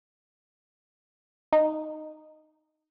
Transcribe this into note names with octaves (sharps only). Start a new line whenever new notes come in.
D#4